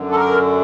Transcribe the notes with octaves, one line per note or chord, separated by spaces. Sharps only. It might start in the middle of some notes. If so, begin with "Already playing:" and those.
Already playing: F#2 D3
A4
A#4